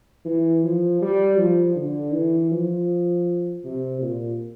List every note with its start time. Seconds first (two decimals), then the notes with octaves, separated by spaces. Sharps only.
0.25 E3
0.64 F3
1.01 G3
1.38 F3
1.76 D3
2.13 E3
2.51 F3
3.64 C3
4.02 A#2